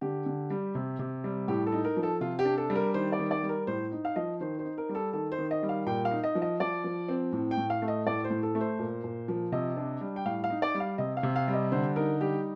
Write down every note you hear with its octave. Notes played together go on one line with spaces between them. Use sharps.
D3 G4
D3
G3
C3
C3
G3
A2 G4
A4
D#4
A#4
F3
A4
C3 F4
G4
D4
A4
G3
A#4
D#3 C5
D5
D#3
D5
G3
A#4
A2 C5
D#4
F5
F3 D#5
D#3 C5
C5
D#4
A#4
G3
A4
D#3 A4
C5
D#3
D#5
G3
F5
A#2 G5
F5
D#4
D#5
F3
D#5
F3 D5
F3
C4
A2
G5
A2
F5
A3
D#5
A2 D5
C5
A2
A4
A3
C5
A#2
A#2
F3
C3 D#5
D4
G3
G5
A2 F5
F5
D#4
D5
G3
F5
C3 D#5
F5
C3
F5
G3
D#5
D3 C5
D#4 A#4
G3 G4